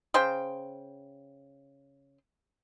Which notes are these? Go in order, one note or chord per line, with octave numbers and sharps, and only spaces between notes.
C#3 C5 G5